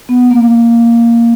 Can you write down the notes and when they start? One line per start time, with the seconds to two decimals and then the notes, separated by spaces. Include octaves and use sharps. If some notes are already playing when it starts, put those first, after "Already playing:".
0.09 B3
0.31 A#3